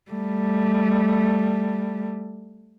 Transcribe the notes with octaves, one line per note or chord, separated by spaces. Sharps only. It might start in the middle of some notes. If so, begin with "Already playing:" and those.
G3 A3